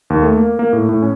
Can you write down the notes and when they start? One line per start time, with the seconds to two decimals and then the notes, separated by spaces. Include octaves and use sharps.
0.10 D#2
0.22 A3
0.37 A#3
0.59 A#3
0.73 A2
0.89 A2
1.02 C#4